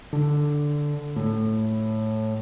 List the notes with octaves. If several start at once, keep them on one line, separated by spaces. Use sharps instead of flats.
D3
A2